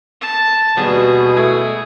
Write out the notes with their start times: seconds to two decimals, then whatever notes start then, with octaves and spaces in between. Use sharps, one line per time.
0.21 A5
0.77 D#2 B2 G3 B3 G#4
1.36 A3 E4 G#6